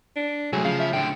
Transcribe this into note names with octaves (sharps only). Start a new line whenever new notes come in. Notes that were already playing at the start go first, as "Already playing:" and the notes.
D4
C2 F#3 A3 G#4
C#3 F3 F5
E5
A2 D3 G5